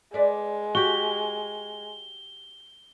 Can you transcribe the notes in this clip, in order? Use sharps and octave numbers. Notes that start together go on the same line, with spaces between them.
G#3 B4 D5
F#4 G4 G7